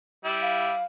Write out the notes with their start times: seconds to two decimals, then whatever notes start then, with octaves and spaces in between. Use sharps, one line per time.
0.25 G3 E4
0.42 F5